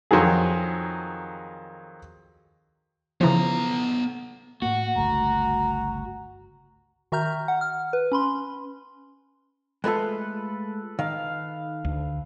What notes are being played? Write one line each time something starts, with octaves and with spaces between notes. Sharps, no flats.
F2 D#3 F#3 G#4
C#3 E3 F3 B3 A#5
A2 A#3 F#4 F#5
G1 C#2 A3 A#5
D#3 F#4 E5 A#5 F6 G6
F#5
F6
B4
C#4 B5 C6
G#3 A3 F4 A4 B4
D#3 F5
D2